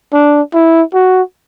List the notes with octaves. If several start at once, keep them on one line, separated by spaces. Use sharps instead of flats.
D4
E4
F#4